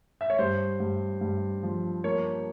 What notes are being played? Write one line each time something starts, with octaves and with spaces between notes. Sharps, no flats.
E5
C#5
G2 C5
G2
G2
F3
A#3 C#5